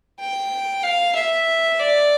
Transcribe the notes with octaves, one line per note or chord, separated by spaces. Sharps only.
G5
F5
E5
D5